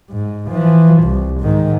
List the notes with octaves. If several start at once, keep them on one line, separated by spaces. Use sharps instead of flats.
G#2
E3 F3
C2
G#2 D#3